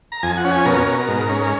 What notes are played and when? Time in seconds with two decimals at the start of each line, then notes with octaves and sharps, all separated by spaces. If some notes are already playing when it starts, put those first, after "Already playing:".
0.12 A#5
0.23 F2 G#5
0.37 F#5
0.45 C#4
0.51 G#5
0.65 B2 A#4
0.87 B2
1.08 G#2
1.29 C#4
1.41 A#4